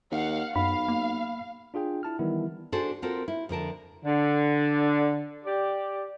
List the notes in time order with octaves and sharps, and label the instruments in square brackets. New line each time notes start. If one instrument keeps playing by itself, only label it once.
[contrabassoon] D#2 [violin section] F5 F#5
[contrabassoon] B1 [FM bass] F#2 [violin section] F5 [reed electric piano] B5
[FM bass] A#3
[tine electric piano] D4 F4 G#4 G5
E4 A5 F6
D#3 E3 G3 B3 E4
[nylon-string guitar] D4 F#4 G#4 A4 C5
C4 F4 F#4 A4 A#4 C5
E4
F2 D3 A#4 A5
[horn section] D3
G4 D5